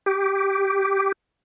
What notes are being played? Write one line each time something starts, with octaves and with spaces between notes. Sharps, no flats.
G4